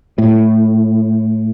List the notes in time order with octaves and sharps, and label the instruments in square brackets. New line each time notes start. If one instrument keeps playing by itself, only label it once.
[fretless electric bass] A2